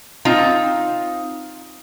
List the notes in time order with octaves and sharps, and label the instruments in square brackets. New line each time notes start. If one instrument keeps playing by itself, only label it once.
[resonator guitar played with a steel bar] C4 D#4 F4